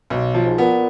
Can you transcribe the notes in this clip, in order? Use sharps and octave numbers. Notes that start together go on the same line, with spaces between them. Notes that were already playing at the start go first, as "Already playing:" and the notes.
B1
F3
G#2
A#2 B3